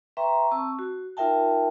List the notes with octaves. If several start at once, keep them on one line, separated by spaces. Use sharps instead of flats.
B4 E5 G5 A#5 C6 C#6
C4 A5 C#6 E6
F#4
D#4 F4 A#4 E5 G5 A5